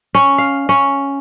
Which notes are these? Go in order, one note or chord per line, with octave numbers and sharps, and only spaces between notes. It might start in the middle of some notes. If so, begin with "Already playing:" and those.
C#4
F5
C#4